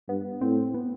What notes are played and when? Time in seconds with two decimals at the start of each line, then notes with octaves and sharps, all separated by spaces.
0.09 G2 B3
0.41 A2 C4
0.74 B3